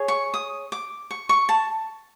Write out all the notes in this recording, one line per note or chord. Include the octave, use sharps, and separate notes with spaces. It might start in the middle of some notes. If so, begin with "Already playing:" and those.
Already playing: G#4 C#5
C#6
D#6
D6
C#6
C#6
A5